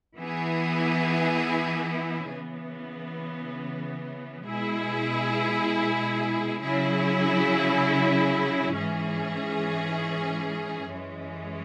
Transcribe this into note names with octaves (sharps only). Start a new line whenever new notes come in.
E3 B3 E4 G#4
C#3 E3 B3
B2 G#3 E4 G#4
C#3 F#3 E4 G#4
G#2 E3 C#4 G#4
F#2 E3 G#3 C#4